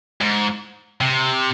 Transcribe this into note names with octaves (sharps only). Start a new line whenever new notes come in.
G#2
C3